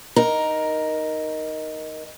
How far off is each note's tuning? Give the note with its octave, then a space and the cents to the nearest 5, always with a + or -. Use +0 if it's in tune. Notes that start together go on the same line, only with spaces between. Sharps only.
D#4 +0 A#4 +10